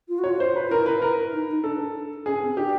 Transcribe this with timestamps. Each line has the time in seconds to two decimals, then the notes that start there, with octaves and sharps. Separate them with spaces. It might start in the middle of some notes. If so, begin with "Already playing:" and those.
0.08 F4
0.19 F#4 C#5
0.29 F4
0.40 C5
0.56 B4
0.66 F4
0.71 E4 A#4
0.86 B4
1.02 A#4
1.33 D#4
1.49 D#4
1.64 D4 A4
2.26 C#4 G#4
2.42 C4
2.57 D4 G4